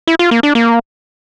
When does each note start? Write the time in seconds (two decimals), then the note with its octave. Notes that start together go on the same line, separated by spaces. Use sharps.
0.07 E4
0.19 F4
0.31 A#3
0.43 D4
0.55 A#3